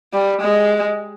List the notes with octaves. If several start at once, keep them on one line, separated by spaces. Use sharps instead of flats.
G3
G#3